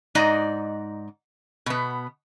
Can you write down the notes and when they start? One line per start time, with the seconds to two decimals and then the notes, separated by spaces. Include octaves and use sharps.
0.15 G#2 D#4 D5 D#5
1.66 B2 B3